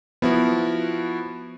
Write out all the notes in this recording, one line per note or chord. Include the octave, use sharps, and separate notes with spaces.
F3 B3 E4 F#4